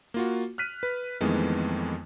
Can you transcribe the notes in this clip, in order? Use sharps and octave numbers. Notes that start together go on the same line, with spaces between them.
A#3 F4 F#4
F6 F#6 B6 D#7
B4
F2 D#3 E3 G#3 A3 B3